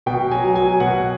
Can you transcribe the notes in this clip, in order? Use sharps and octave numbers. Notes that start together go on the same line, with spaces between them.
B2 G5
F#3 G#5
F#3 G#5
B2 F#5